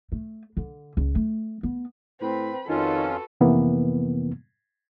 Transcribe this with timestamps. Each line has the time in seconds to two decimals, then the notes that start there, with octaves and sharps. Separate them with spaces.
0.12 A3
0.57 D3
0.97 C#2
1.15 A3
1.63 B3
2.21 A2 C4 B4 B5
2.68 F2 D#3 C#4 F4 F#4 A4 B4
3.41 F2 C3 E3 A#3 B3